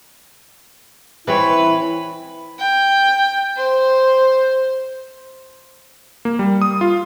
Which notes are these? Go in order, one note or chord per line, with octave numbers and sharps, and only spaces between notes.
E3 C4 E4 B4 C#5
G5
C5
A#3
G3
D#6
F4